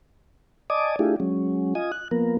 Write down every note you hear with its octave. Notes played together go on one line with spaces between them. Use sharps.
D5 D#5 G#5 A5 D6 D#6
A3 D4 E4 F4 G4 G#4
F#3 G#3 C#4
F4 D#5 G#5 D#6
F#6
F3 A#3 B3 A#4